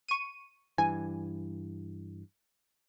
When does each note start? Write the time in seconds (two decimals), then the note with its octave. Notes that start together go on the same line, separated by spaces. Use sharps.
0.08 C#6 D#7
0.78 G2 E3 G#5